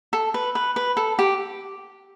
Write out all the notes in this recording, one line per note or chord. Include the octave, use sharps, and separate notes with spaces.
A4
B4
B4
B4
A4
G4